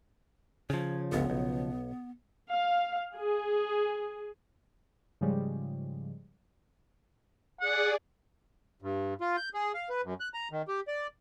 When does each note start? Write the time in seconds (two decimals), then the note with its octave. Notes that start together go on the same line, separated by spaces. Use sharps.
0.70 C#3 F3 C#5
1.12 G1 C#2 B3
1.30 B1
2.53 F5
3.15 G#4
5.21 G#2 C#3 F3 G3 G#3
7.61 G#4 D5 F#5
8.82 G2
9.21 F4
9.37 G6
9.54 G#4
9.74 F5
9.90 B4
10.03 F#2
10.20 F#6
10.34 A#5
10.52 D#3
10.68 G4
10.88 D5